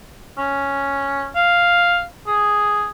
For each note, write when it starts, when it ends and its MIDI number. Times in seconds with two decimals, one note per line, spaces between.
0.38 1.26 61
1.36 2.04 77
2.27 2.88 68